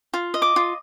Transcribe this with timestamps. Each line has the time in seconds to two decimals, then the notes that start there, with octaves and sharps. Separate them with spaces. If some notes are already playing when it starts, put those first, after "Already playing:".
0.13 F4
0.34 D#5
0.42 D6
0.56 F4